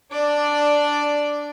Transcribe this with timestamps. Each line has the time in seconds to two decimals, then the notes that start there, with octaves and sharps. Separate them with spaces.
0.12 D4 D5